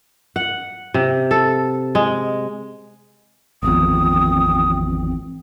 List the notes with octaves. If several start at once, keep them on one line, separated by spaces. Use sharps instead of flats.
F#5
C3
A4
G#3
G#1 E2 F3 C4 D#6